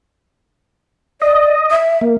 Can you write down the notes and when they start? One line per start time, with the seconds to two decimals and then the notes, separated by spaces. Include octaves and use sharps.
1.22 D5 D#5
1.71 E5
2.01 A#3